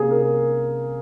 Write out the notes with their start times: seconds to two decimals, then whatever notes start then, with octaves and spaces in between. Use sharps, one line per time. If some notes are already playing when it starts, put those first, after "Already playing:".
Already playing: C3 A#3 C#4 G#4
0.11 A#4